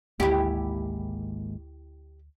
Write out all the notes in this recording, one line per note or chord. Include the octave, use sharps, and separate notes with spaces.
G#1 D2 G#3 A#3 E4 G4